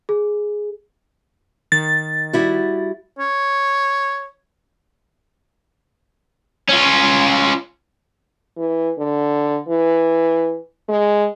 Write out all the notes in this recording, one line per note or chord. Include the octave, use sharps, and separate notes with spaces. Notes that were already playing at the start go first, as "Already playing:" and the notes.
G#4
D#3 A6
G3 E4 F#4
C#5
C#4 F4
E3
D3
E3
G#3